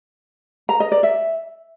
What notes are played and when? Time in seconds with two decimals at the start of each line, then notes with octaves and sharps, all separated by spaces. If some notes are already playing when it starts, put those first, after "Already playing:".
0.69 A#5
0.80 D#5
0.92 D5
1.03 E5